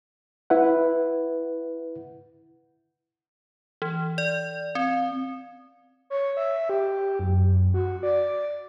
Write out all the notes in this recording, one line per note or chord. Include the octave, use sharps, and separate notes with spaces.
E4 B4 F#5
E3
D5
C4
C#5
E5
G4
F#2
F#4
D5